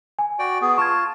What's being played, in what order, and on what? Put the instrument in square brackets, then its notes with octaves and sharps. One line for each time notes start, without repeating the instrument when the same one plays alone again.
[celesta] G#5
[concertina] F#4 D5 G5
B3 G#4
[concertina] F4 A5 [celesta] C#6 G#6